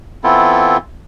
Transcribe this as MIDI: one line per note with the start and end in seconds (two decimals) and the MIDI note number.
0.24 0.77 52
0.24 0.77 59
0.24 0.77 60
0.24 0.77 64
0.24 0.77 65
0.24 0.77 69